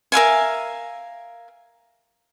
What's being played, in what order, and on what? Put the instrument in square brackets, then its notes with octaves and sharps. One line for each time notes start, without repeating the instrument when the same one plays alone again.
[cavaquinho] A#4 E5 F5 G#5